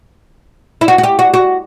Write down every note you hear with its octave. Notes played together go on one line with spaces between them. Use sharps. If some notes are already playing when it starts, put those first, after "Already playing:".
E4
F#4
F#4
G4
F#4
F#4